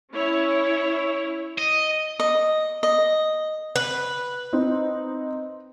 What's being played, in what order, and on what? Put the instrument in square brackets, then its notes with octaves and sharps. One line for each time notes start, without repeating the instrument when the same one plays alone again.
[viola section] C#4 E4 C#5
[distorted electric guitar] D#5
[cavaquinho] D#5
D#5
[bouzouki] B4
[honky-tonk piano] C4 D#4